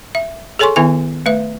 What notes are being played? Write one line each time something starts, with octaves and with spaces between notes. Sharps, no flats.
E5
G#4 A4 C#5 G#5 C6 C#6
D#3 B3 E4 E5 G#5
A3 B4 E5